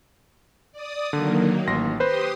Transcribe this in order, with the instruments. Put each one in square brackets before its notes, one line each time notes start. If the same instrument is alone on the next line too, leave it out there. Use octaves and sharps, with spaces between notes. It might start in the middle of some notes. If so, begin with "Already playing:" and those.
[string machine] D5 D#6
[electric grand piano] D3 [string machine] D#3 F#3 A#3
[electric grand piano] A1 C6 A#6
[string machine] G4 C6 D#6 [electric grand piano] B4 C5 B5